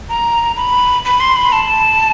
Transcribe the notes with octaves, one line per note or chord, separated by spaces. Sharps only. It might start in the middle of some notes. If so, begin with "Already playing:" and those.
A#5
B5
B5
C6
B5
A5